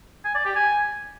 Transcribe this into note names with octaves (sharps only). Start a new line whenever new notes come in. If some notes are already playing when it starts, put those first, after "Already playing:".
G#5
D5
G4
G#5